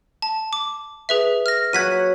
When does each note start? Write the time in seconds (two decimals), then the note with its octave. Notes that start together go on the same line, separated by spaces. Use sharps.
0.22 A5
0.53 D6
1.09 G#4 B4 E5
1.46 F6 A#6
1.73 F#3 F#5 G#6 B6 D#7